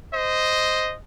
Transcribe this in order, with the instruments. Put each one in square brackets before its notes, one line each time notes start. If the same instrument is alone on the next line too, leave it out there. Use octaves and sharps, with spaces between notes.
[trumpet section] C5 D#5